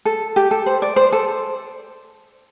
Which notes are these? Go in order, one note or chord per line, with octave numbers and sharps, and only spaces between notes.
A4
G4
A4
C5
D5
C5
A4